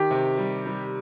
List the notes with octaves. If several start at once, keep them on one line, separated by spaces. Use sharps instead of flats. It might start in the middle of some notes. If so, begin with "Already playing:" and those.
Already playing: D#3 G4
C3
G3
G3